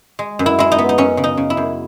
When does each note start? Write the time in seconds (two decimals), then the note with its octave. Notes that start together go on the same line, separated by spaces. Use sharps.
0.19 G#3
0.39 F#2
0.46 E4
0.59 G#3 E4
0.72 D#4
0.78 B3
0.89 D#4
0.98 F#2 C#4
1.17 C#3
1.24 D#4
1.37 C#3
1.50 E4
1.57 F#2